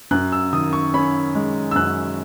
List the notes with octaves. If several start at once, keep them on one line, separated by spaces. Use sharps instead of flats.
F#2 F#6
E6
D#3 D#6
C#6
C#4 B5
G#3
E6
F#2 F#6